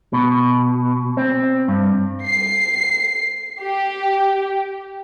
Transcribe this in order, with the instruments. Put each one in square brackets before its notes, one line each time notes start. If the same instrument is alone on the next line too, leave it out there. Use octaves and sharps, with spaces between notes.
[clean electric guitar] B2
C4
G2
[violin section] C7
G4